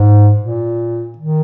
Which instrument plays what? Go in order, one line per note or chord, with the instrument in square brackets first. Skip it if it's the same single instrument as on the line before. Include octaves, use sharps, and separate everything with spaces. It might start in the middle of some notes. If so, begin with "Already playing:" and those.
Already playing: [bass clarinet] G#2
A#2
D#3